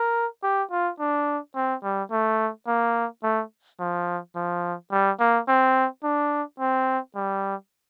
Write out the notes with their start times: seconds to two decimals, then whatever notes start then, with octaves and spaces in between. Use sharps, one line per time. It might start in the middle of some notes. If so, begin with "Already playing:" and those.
Already playing: A#4
0.43 G4
0.71 F4
0.99 D4
1.55 C4
1.83 G3
2.11 A3
2.67 A#3
3.23 A3
3.80 F3
4.35 F3
4.91 G3
5.20 A#3
5.48 C4
6.03 D4
6.59 C4
7.16 G3